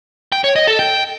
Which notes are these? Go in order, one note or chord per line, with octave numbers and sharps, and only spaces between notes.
G5
C#5
D#5
A4
G5